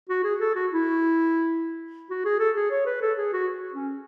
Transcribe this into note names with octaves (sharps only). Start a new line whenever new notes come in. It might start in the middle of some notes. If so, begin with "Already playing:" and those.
F#4
G#4
A4
F#4
E4
F#4
G#4
A4
G#4
C#5
B4
A4
G#4
F#4
C#4